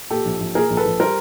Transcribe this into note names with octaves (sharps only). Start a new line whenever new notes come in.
A#2 G4 A4
A#1
A#1
A#2 G#4 A#4
A#1
A4 B4
A#1
G3 A#4 C5